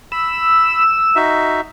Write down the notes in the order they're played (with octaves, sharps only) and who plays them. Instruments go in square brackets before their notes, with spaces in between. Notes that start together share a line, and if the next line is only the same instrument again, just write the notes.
[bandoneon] B5 [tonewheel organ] E6
[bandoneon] D#4 F#4 E5